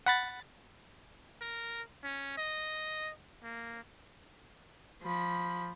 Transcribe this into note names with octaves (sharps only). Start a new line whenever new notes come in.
F#5 B5 A6
A#4
C#4
D#5
A#3
F3 B5